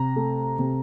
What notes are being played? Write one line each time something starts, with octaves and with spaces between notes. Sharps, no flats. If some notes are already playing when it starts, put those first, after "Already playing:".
Already playing: C3 A#5
A3
C3